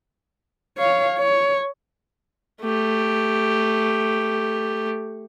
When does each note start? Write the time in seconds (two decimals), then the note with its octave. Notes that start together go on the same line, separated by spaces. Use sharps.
0.78 C#5 F5
1.19 C#5
2.62 A3 G4